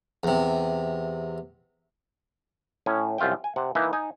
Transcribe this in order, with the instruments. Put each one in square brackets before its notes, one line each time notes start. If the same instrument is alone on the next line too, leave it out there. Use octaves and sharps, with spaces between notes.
[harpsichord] E2 C3
[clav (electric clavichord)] A2 C#4 G#5
C2 F#2 F4 E5 G5
G#5
C3 F#5
E3 A#3 D#4 B4 E5
D#4 G#5